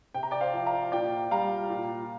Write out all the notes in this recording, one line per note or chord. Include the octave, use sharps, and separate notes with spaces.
C3 G5
A#5
D5 G5
C5 F5
F3
F5 A#5
A#2 D5 G5
G3 F5 A#5
A#2